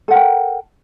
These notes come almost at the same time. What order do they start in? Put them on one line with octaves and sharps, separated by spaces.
A4 F#5 A#4 G5